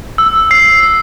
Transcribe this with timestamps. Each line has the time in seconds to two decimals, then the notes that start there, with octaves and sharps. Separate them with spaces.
0.18 E6
0.51 C7